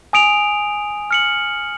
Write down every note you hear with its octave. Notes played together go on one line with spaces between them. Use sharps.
G#5 D#6 D7 F7
F6 C#7 F#7